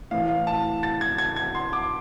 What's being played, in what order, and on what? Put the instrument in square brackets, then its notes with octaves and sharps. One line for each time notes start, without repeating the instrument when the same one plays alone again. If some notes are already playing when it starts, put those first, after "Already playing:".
[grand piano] A2 E3 F5
F5
A5
A6
G#6
G#6
G#6
C6
D6